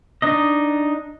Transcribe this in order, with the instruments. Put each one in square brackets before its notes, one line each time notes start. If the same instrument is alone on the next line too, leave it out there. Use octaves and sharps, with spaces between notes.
[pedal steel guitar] D4 D#4 D#5